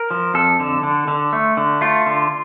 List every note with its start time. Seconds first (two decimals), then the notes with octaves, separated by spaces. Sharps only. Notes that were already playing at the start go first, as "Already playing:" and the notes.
Already playing: A#4
0.11 F3
0.34 F2 A4
0.60 D3
0.83 D3
1.08 D3
1.33 A3
1.57 D3
1.81 A3 F4
2.06 D3